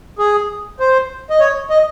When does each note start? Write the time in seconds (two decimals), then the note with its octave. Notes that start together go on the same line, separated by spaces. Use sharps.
0.18 G#4
0.80 C5
1.30 D#5
1.40 C#5
1.70 D#5